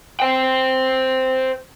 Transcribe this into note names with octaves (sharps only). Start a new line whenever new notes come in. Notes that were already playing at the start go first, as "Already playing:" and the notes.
C5 G5